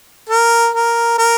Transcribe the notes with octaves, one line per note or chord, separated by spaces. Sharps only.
A#4
A#4
A#4